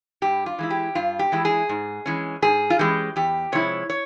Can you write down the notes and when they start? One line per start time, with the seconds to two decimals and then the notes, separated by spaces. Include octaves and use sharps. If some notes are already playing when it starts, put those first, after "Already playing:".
0.22 G2 G4
0.46 F4
0.59 E3 G#3 E4
0.70 G4
0.95 G2 F4
1.19 G4
1.32 E3 G#3 E4
1.45 G#4
1.69 G#2
2.06 E3 G#3 C#4
2.42 G#2 G#4
2.70 F4
2.79 E3 G#3 C#4 G4
3.16 E2 G4
3.52 C3 F3 G#3 E4 C#5
3.90 C#5